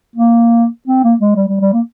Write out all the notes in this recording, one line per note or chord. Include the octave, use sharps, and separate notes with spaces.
A#3
C4
A#3
G#3
G3
G3
G3
A#3